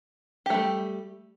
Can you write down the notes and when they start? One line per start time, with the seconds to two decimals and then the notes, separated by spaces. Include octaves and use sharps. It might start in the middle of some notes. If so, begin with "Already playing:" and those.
0.46 G4
0.50 A3
0.54 G3